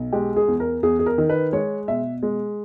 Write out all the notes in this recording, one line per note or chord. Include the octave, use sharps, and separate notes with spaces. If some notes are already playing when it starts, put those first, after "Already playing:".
Already playing: B1
G#3 G4
G#4
E2
A#4
E2 G#4
G#4
A#4
D#3
B4
G#3 C#5
B2 E5
G#3